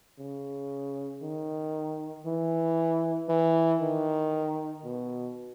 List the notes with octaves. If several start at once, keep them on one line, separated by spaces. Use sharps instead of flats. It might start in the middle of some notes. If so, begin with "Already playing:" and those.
C#3
D#3
E3
E3
D#3
B2